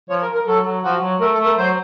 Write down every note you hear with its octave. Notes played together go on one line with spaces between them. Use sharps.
F3 C#5
A#4
A#4
F#3 A4
F#3
F3 F#4
F#3
A3 A#4
A4
A3
A#4
F#3 C5